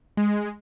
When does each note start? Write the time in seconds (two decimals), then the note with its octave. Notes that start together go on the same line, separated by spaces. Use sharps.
0.17 G#3